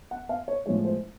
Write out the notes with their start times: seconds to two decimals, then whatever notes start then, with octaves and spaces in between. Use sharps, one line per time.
0.11 F#5
0.29 F5
0.48 C#5
0.66 A2 F3 G#3 C#5
0.85 C5